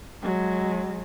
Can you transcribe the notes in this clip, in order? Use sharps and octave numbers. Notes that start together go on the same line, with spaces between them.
F#3 G#3